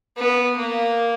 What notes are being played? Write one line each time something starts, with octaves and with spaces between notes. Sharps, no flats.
B3
A#3